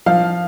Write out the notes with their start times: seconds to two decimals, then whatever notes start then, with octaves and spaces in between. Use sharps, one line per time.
0.06 F3 F5